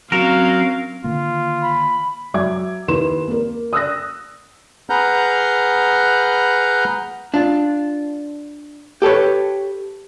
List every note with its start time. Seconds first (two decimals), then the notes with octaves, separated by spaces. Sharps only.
0.12 F#3 C4 C#4 A#4 F5
1.04 D3 D#3 A#3 F4
1.62 B5
2.34 F#3 E5 D6 G#6
2.88 D#2 E4 A#4 B4 C6 E7
3.28 A#3 A#4
3.73 D#6 E6 F#6 A#6
4.90 G#4 B4 F#5 A#5 F6 G6
7.34 D4 F4
9.02 G4 A4 B4 C#5